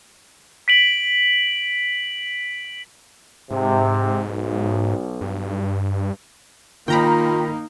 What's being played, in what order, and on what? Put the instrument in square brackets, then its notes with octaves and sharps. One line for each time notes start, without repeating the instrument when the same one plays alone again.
[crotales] B6 D7 F#7
[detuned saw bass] G#2 [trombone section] C3
[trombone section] B1
[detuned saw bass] G2
[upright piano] D#3 [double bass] A#3 D#4 [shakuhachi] F4 [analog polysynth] G5 A#5 B5